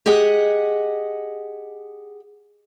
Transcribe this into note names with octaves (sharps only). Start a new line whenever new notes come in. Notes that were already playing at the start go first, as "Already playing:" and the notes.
G4 G#4 D#5 F#5